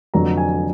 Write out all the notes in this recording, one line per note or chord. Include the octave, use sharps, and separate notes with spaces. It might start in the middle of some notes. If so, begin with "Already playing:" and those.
F1 F2 D3 F#3 A#5
G#5